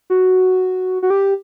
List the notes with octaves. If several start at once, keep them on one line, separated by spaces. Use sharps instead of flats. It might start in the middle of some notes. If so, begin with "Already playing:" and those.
F#4
F#4
G4